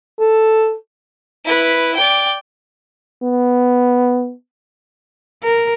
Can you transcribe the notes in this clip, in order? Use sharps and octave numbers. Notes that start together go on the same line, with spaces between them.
A4
E4 B4
D5 G5
B3
A#4